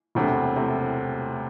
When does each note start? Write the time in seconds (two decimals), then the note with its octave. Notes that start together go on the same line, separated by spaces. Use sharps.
0.15 E1 D2 C3 A3
0.56 C3 A3